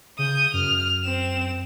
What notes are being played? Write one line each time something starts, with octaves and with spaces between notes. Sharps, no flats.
C#3 D#6 G6
F#2 F6
C4 E7